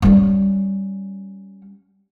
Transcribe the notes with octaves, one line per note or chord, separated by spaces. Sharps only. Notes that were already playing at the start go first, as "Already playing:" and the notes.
G3 C#4